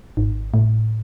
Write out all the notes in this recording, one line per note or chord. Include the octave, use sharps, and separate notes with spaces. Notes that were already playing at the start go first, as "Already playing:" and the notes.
G#1
A2